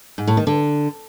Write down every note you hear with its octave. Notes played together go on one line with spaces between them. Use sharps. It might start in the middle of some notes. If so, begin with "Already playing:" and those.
G#2
A2
D#3
D3